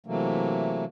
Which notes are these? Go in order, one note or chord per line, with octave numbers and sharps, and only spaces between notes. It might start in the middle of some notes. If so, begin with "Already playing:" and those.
C3 E3 F#3 A3 A#3